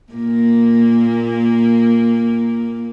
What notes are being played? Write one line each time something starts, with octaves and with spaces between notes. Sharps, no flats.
A#2 A#3